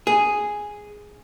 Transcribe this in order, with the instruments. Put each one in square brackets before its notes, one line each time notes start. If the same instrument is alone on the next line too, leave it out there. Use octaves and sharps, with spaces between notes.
[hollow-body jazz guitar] G#4